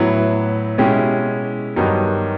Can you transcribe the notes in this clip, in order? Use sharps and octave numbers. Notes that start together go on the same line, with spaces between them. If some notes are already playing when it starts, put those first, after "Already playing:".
Already playing: A2 F#3 B3 E4
B2 G#3 C#4 E4 G4
G2 D#3 F#3 B3 D#4